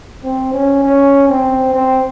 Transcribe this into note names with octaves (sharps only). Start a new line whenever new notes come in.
C4
C#4
C#4
C4
C4